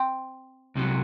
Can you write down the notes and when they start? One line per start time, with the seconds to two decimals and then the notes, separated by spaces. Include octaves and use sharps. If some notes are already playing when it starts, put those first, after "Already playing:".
Already playing: C4
0.75 C2 C3 F#3